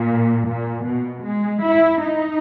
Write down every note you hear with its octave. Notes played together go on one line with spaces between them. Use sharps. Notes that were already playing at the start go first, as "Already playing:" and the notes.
Already playing: A#2
A#2
B2
G#3
E4
D#4